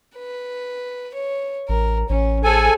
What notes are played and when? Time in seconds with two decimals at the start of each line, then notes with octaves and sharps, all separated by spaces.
0.16 B4
1.14 C#5
1.69 A1 A#4
2.09 A1 C#4
2.44 G#4 A4 C5 G#5